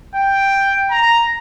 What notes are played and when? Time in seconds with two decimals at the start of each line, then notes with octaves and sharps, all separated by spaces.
0.15 G5
0.91 A#5